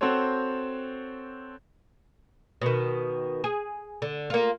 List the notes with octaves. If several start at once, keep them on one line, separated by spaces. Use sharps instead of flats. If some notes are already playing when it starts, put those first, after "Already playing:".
C4 F#4 A4 C5 C#5
B2 D#3
G#4
D3
A#3 F4